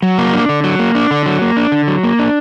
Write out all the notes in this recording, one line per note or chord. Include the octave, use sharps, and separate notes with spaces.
F#3
A#3
D4
D3
F#3
A#3
D4
D3
F#3
A#3
D4
D3
F#3
A#3
D4